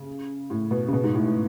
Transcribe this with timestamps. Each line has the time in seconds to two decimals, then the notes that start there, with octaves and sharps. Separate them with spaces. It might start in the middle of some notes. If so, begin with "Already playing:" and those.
Already playing: C#3
0.50 A2
0.71 B2
0.88 C#3
0.93 B2
1.04 G#2
1.14 A2
1.26 A2